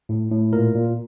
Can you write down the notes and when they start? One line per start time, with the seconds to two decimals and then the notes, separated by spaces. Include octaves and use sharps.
0.09 A2
0.31 A2
0.53 A#2 A#4
0.75 A#2